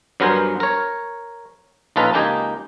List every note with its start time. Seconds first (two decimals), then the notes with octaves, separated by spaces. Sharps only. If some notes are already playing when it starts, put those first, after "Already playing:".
0.20 G2 F#3 B3 A#4 C5 G#5
0.60 A#4 C#5
1.96 A#1 C#4 D#4 F4 A4 B4
2.13 C#2 A#3 D#4 G4 D#5 G#5